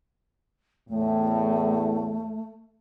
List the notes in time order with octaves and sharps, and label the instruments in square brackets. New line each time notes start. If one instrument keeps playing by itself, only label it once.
[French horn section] E2 A2 [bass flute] A3